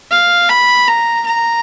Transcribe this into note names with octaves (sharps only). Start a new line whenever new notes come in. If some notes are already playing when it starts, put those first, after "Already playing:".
F5
B5
A#5
A#5